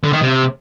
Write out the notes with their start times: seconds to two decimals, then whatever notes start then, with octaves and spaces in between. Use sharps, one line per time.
0.04 D3
0.13 D#3
0.22 C3